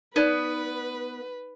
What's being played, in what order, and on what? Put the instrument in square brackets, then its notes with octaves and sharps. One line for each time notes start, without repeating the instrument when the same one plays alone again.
[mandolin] B3 [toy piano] D#4 D5 [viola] B4